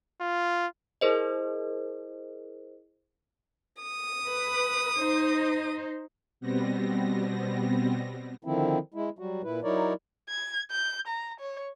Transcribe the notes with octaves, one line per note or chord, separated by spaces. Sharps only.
F4
E4 G#4 A#4 C5 D#5
D#6
B4
D#4 C5
B2 G3 B3 C4 A#6
D3 D#3 F3 C4 E4
G#3 E4
F#3 G3 F#4
A#2 E4 B4
F#3 D#4 E4 A#4 C#5 D5
G#6
G6
A#5
C#5